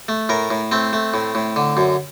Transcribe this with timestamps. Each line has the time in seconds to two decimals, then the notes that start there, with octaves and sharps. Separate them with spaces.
0.08 A3
0.29 A2 A#4
0.51 A2
0.71 A3 C4
0.93 A3
1.14 A2
1.35 A2
1.56 D3
1.77 F#2